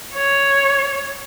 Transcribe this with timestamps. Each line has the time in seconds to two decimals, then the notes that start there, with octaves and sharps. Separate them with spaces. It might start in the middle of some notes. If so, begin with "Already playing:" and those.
0.15 C#5